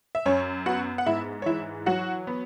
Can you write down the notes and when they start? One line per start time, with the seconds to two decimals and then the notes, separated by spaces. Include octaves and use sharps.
0.15 E5
0.26 F#2 C#4 C#5
0.66 B3 F#4 F#5
0.98 F#5
1.06 G#2 E4 E5
1.42 C#5
1.46 E3 E4 E5
1.86 F#3 F#4 F#5
2.27 B3